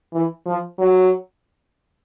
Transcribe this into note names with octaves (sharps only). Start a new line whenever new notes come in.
E3
F3
F#3